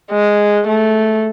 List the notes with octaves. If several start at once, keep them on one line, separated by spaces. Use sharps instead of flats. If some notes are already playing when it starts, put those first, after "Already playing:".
G#3
A3